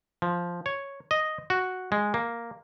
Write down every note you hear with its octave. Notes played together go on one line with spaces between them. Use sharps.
F3
C#5
D#5
F#4
G#3
A#3